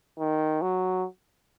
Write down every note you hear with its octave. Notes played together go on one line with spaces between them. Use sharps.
D#3
F#3